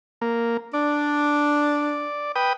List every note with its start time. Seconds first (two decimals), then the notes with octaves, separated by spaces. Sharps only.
0.21 A#3
0.73 D4 D5
2.35 B4 G5 D#6